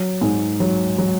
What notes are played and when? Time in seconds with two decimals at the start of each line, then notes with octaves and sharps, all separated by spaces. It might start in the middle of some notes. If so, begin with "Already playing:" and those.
Already playing: F#3
0.21 G#2
0.60 F#3
0.98 F#3